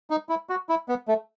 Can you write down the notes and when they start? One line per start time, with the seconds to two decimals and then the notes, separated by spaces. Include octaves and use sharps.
0.10 D#4
0.29 E4
0.49 F#4
0.69 E4
0.88 B3
1.08 A3